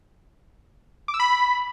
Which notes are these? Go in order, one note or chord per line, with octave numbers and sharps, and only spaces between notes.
D6
E6
B5